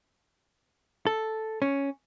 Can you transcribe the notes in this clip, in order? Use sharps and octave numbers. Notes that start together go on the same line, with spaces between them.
A4
C#4